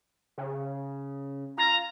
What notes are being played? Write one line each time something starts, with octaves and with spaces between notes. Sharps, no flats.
C#3
F4 A#5